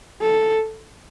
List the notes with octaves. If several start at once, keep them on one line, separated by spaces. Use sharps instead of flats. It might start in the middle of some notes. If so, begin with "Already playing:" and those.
A4